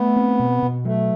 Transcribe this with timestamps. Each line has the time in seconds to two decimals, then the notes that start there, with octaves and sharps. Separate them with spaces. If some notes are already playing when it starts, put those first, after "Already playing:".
Already playing: A3 B3
0.16 C4
0.39 B2
0.63 B2
0.85 F#3 A3